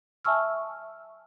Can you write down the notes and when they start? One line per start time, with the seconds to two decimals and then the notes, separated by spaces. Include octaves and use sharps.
0.25 E5 G#5 A5 C#6 E6 F6